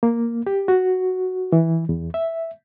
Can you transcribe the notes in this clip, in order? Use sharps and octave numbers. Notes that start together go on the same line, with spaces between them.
A#3
G4
F#4
E3
E2
E5